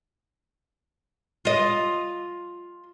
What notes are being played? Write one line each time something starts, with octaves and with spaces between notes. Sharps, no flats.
F4 D#5